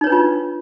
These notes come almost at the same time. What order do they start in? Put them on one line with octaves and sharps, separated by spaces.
D#4 C#5 B4 D4 F4